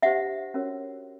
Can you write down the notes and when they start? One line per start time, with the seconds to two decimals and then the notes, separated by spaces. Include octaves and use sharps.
0.02 D4 G4 C5 E5 F#5
0.54 C#4 F#4 A#4 C#5